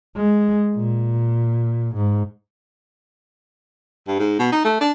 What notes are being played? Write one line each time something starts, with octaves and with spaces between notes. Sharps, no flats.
G#3
A#2
G#2
G2
G#2
B2
D#4
A3
D4